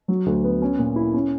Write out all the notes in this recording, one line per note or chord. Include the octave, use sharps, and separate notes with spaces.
F#3
D2
B3
C#4
A#2
E4
C#4